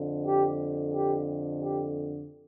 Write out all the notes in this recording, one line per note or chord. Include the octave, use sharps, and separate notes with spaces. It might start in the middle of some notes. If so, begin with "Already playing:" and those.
Already playing: F2 D3
G4
G4
G4